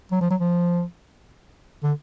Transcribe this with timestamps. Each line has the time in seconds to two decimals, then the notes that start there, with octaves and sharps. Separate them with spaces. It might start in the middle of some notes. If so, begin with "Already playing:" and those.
0.12 F#3
0.21 F3
0.30 F#3
0.40 F3
1.83 D3